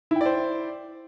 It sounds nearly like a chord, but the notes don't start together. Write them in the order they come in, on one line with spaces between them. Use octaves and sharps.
E4 G5 D5 C5